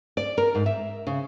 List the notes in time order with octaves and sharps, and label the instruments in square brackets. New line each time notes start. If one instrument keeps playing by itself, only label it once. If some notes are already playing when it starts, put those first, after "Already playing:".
[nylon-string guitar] D5
A#4
G#2
E5
C#3